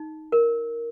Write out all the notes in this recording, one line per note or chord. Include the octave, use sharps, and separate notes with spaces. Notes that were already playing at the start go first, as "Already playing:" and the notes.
Already playing: D#4
A#4